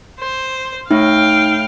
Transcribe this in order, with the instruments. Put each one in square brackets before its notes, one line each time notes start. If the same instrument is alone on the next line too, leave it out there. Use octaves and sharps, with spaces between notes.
[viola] C5
[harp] A2 [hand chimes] D#4 [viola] F5 G5